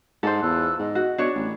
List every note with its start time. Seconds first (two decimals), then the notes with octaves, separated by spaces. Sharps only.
0.23 G#2 A4 C5
0.43 E2 F4 E6 F#6
0.79 G#2 D#5
0.95 F#4
1.18 B2 D4 C#5
1.35 A1